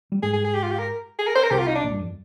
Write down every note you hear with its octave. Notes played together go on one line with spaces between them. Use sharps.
G3
G#2 G#3 G#4
G#4
G#4
G4
F4
G4
A#4
G#4
A#4
C5
A#4
C2 C3 G4
F4
D#4
D4
A#1 A#2
G2
F2